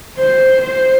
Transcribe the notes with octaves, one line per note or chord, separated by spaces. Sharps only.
C5
C5